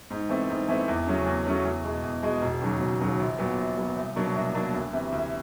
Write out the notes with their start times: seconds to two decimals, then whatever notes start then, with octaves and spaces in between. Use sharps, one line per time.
0.10 G#2
0.29 E3 A3 C4
0.50 G#2
0.68 E3 A3 C4
0.88 E2
1.06 C#3 F#3 A3 C#4
1.26 E2
1.45 C#3 F#3 A3 C#4
1.65 E2
1.84 B2 G#3
2.03 E2
2.23 B2 G#3
2.42 E1
2.61 D#2 C#3 F#3
2.80 E1
3.00 D#2 C#3 F#3
3.19 A#1
3.38 A#2 F#3 B3
3.58 A#1
3.78 A#2 F#3 B3
3.96 C2
4.16 B2 F#3 A#3 D4
4.35 C2
4.54 B2 F#3 A#3 D4
4.74 D2
4.93 C3 E3
5.12 D2